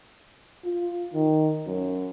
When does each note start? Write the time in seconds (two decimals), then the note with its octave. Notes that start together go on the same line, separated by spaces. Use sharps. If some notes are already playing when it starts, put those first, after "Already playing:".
0.64 F4
1.13 D#3
1.66 F#2